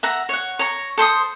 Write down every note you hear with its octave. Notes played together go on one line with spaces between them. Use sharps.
E5 F#5 A#5
C#5 F#5
C#5 A#5
A4 C5 C6 D#6